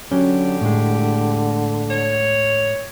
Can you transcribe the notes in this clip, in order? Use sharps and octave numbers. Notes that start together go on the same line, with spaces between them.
D3 F#3 C#4 G4
A2 G#3
C#5